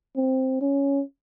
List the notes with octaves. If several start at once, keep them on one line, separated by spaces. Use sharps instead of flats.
C4
C#4